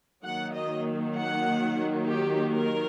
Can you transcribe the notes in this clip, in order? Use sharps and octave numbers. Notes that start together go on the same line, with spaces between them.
D#3 F#3 A#3 F#5
D#5
F#5
G4
A#4